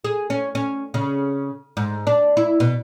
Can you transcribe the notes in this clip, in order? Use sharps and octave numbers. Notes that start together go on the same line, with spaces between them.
G#4
C#4
C#4
C#3
G#2
D4
E4
B2